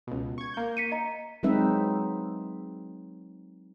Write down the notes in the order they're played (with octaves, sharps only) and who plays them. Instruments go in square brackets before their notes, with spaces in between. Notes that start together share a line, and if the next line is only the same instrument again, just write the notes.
[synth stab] C#2 B2
C#6 G#6
A#3 G6
[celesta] B6 C#7 D#7
D#5 A#5
[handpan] F#3 G#3 C4 D#4 B4 E5